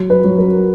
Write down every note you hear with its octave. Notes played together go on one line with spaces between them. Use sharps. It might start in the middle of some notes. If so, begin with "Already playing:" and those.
Already playing: F#3
B4
F#3
A#4